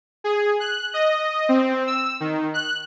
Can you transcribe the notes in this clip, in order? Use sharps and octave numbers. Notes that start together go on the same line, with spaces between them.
G#4
F#6
D#5
C4
E6
D#3
F#6